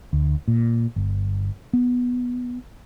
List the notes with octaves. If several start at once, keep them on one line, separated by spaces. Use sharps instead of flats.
D2
A#2
G1
B3